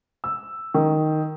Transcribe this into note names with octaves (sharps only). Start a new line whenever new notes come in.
E6
D#3